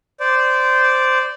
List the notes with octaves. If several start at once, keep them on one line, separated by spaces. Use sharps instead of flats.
C5 D5